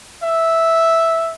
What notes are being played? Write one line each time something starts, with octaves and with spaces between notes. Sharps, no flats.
E5